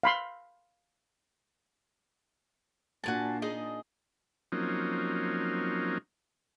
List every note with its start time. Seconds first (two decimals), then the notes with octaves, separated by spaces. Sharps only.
0.03 F5 B5 C6
3.04 A#2 D4 F#4 G#5 A5
3.42 D#4 G#4 D#5
4.52 F3 F#3 A#3 C4 C#4 D#4